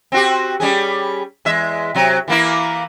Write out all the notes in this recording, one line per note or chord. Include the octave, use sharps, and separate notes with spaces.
C4 F#4 G4
G3 C#4 G#4
E2 G#3 E5
C3 F#3
E3 A#3 E4